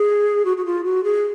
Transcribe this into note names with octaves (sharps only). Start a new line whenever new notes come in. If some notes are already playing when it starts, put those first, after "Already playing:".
Already playing: G#4
F#4
F#4
F4
F#4
G#4